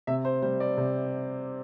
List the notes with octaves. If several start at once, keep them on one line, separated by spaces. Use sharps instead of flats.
C3 E5
C5
G3 C5
D5
C3